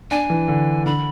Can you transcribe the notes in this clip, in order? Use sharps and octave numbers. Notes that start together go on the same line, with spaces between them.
D4 G#5
E3
D3
D3 B5